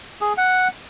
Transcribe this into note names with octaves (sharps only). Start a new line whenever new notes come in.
G#4
F#5